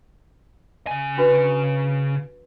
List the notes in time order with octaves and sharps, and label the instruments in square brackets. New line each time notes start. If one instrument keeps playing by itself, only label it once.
[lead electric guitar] C#3 G#5
[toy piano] D4 F#4 B4